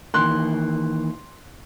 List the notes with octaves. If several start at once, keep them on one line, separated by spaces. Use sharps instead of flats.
D#3 E3 A#3 C6 F#6